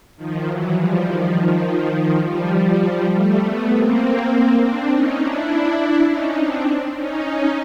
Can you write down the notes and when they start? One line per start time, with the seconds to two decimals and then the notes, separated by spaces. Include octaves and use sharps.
0.16 D#3 F3
0.46 E3 F#3
0.76 F3 G3
1.06 D#3 F3
1.35 D#3 F3
2.24 F3 G3
3.13 G3 A3
3.42 A3 B3
3.72 A#3 C4
4.61 C4 D4
4.90 C#4 D#4
5.20 D4 E4
6.10 C#4 D#4
6.38 C4 D4
6.98 C#4 D#4